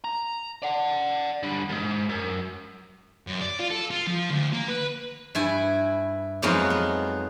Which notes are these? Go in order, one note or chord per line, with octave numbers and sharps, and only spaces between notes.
A#5
D5 F#5
D3 G3
D#2 G#2
F#2
F#2
D5
F4
A4
F4
F3
D2
A#3
B4
G2 E4 G#5
F2 F#3 G#3 B3 D#4 F5
B3